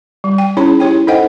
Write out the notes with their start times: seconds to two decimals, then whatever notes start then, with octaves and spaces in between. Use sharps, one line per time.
0.24 G3
0.38 G5
0.57 C#4 D#4 E4 G#4 C#5 B5
0.80 E4 G4 C#5 G5
1.07 D#4 A4 C5 D#5 F#5 G5